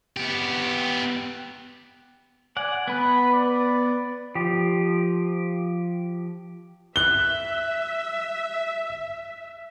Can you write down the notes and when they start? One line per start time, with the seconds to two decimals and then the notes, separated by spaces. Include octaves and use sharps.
0.17 B3 G4
2.57 D5 F#5 G#5
2.88 B3 B4 B5
3.33 D5
4.35 F3 G4
6.96 E5 F#6 G7